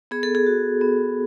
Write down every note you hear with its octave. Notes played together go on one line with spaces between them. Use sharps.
B3 G#4
A4
G#4
F#4
B3